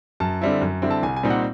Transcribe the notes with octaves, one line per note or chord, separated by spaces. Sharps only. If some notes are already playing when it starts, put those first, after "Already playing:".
F#2 A5
D3 G3 C4 E4
F#2
D3 G3 C4 E4
A5
C2 G#5
G#5
A#2 G3 C4 D#4
F#5